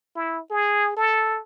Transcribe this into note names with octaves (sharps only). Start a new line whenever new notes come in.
E4
G#4
A4